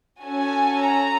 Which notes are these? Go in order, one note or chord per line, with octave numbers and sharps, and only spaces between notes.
C#4 F#4 A4 G#5
A#5